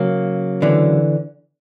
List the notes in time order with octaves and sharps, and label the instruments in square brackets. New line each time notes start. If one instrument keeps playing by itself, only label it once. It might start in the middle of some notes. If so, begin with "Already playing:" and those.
Already playing: [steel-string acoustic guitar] C#3 F#3 A#3
[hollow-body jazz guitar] D3 E3